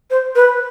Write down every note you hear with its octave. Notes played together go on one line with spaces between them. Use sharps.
C5
B4